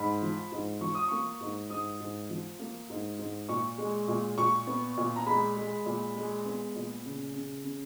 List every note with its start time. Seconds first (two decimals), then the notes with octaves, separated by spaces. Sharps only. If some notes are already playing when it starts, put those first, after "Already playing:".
Already playing: G#2 B5
0.22 F3
0.52 G#2
0.81 F3 C#6
0.95 D#6
1.08 A#3 C#6
1.40 G#2
1.70 G#2 D#6
2.00 G#2
2.30 F3
2.59 A#3
2.89 G#2
3.19 G#2
3.49 A#2 C#6
3.78 G#3
4.08 A#2
4.38 A#2 C#6
4.67 B3
4.97 A#2
5.16 A#5
5.26 G#3 B5
5.57 G#3
5.86 A#2
6.16 G#3
6.45 B3
6.75 A#2
7.05 C#3
7.35 C#3
7.64 C#3